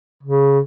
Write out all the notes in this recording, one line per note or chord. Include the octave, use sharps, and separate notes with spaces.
C#3